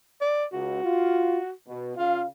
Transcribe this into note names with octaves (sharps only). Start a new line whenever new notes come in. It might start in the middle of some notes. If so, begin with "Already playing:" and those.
D5
C#2 F#4
F4
B2
C#3 F4 F5